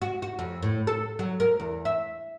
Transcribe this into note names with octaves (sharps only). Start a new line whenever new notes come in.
F#4
F#4
F2
A2
A4
F#3
A#4
E2
E5